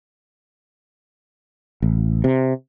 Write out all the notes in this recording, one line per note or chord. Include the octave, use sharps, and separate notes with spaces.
A1
C3